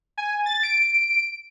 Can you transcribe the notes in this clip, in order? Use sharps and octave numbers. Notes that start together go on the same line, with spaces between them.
G#5
A6
D7